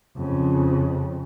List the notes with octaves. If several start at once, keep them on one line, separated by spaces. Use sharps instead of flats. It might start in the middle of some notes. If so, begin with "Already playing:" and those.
F2 C#3